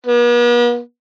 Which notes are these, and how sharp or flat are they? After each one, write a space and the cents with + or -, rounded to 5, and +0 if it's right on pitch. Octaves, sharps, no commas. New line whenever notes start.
B3 -45